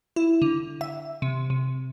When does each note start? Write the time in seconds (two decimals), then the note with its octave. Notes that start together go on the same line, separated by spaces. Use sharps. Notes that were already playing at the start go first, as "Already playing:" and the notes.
0.16 E4
0.42 D3
0.81 E5
1.22 C3
1.50 C3